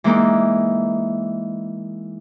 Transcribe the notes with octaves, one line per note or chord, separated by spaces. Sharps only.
E3 G#3 A#3 D#4